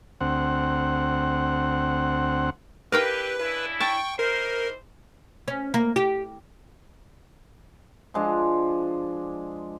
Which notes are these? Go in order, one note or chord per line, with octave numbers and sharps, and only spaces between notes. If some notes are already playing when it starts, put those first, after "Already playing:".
D2 C4 F#5
D4 E4 G4 A#4 B4 F5 G5
C#3 D4 E4 B4
G5 A5 C#6
E3 D#4 A#4 C5
C#4
A#3
G4
F3 G#3 D4